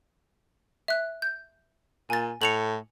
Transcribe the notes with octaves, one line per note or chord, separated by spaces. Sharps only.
E5 F#6
G6
A#2 G#5 A6
A2 C#7 F7 F#7